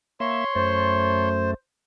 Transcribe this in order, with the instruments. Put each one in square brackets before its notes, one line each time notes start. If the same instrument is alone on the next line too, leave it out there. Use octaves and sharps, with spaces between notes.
[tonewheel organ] A#3 E5 [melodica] C#5 C6
[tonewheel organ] F#2 A3 [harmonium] C5